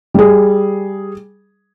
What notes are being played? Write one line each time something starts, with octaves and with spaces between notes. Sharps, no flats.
G3 G#4